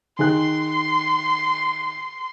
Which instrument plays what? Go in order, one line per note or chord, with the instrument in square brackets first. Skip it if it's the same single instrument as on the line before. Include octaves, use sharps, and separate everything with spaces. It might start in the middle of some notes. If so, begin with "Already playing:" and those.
[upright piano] D#3 G#4 F#6 [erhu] C6